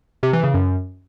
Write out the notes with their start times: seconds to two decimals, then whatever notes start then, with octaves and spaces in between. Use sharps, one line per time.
0.23 C3
0.33 E3
0.44 C#3
0.54 F#2